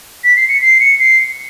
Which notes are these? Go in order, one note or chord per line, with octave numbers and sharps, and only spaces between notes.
B6
C7
C#7
C7
C#7
C7